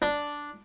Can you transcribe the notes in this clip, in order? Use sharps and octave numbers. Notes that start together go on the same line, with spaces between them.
D4